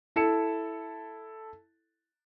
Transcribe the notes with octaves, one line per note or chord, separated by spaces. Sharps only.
E4 A4 C#7 E7